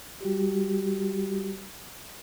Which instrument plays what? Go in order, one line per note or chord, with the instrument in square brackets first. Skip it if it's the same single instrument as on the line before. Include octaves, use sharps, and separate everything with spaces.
[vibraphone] G3 F#4 G4